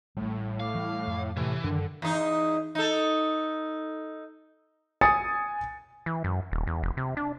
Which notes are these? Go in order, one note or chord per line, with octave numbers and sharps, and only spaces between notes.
A1 A2 G3
F5 D6
E3 G3 A3
F2
A2 C3 E3
F#2 D3 D#3
E2 D#4
D#4 A4
G#5 D#6 A6 C#7
E3
F#2
D#1
E2
F1
C3
D4